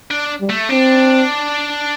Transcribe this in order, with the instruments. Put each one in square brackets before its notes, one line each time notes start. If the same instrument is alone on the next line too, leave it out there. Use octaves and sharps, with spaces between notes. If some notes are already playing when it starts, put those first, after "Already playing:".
[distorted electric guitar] D4
[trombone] G3
[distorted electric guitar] A3
[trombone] C4 [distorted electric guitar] D4